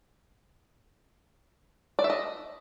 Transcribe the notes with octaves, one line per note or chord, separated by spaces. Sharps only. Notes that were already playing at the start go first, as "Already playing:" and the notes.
D5
E5
D#5